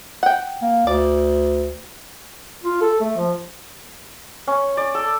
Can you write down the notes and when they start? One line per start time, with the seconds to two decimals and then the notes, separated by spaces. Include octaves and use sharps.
0.23 F#5 G5
0.62 A#3
0.87 D2 D5
2.63 F4
2.81 A4
3.01 A3
3.17 F3
4.47 C#4
4.77 D5
4.95 A4